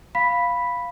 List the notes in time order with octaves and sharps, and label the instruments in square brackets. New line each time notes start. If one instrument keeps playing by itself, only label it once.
[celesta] F5 B5 B6